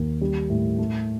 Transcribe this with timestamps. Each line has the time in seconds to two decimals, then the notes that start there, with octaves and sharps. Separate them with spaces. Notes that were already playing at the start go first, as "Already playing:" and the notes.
Already playing: D#2
0.21 G3
0.50 A2
0.78 A3